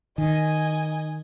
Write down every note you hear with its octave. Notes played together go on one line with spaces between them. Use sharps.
D#3 D#5 G#5